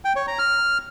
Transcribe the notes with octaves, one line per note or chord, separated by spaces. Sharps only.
G5
C#5
A#5
F6